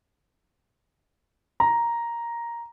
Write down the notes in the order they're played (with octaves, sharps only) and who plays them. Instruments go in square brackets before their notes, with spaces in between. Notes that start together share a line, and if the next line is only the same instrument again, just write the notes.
[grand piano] A#5